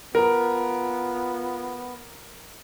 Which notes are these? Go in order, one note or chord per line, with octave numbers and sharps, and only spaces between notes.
B3 F4 A#4